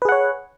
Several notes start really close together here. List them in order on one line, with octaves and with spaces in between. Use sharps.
B4 G#4 F#5 C#5